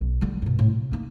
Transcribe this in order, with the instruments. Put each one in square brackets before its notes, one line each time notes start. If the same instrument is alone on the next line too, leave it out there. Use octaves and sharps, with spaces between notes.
[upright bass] B1
D3 G3
G2 B2
A2
C3
A#3 D#4